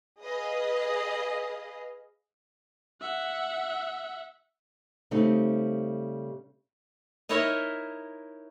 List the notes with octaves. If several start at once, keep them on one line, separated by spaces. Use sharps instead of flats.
G#4 B4 D#5 F5
E5 F#5
C#3 G3 A3 C4 D#4
D#4 E4 A#4 C#5 D#5 E5